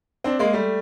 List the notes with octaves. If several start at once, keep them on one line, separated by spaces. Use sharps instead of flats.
C4 D4
G#3 A#3
G3 A3